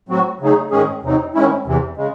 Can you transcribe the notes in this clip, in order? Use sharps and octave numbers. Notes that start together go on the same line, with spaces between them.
A2 F#3 C4 F#4
C#3 F#3 A3 D#4 G#4
G#2 D#3 G#3 C#4 G#4
E2 C3 F#3 C4 D#4
G#2 D#3 G#3 C#4 E4
E2 C3 E3
C#3 G#3